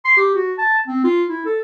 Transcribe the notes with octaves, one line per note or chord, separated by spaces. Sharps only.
C6
G4
F#4
A5
C4
F4
E4
A4